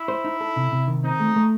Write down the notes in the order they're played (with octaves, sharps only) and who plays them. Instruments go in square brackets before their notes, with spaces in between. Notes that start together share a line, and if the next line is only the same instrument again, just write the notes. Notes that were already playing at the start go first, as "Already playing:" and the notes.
Already playing: [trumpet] E4
[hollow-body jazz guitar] C5
D#4
A4
C3
C3
D#3
[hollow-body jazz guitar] C4 [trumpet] D#4
[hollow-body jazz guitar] A3
A3